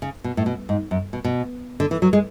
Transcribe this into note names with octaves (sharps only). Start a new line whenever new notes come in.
C#3
B2
A2
B2
G#2
F#2
B2
B2
D3
E3
F#3
G#3